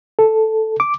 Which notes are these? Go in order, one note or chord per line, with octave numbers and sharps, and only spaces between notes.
A4
D6